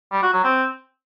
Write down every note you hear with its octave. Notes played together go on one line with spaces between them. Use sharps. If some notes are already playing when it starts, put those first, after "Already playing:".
G3
F#4
F#3
C4